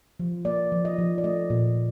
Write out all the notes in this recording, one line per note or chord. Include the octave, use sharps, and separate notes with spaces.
F3
A#3 D5
F3
D#5
F3
D5
A3 D#5
A#2